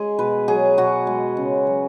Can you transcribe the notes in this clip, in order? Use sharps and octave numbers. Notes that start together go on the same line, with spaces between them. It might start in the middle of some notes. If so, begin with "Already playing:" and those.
Already playing: G#3 G#4
B2 B4
F#3 G#4
B2 F#4
G#3
C#3
F#3